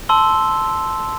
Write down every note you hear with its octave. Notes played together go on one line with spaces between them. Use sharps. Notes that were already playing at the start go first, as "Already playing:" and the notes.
A5 C6 E6 G7